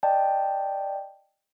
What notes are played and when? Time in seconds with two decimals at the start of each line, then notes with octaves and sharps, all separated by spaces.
0.03 D5 D#5 G5 A5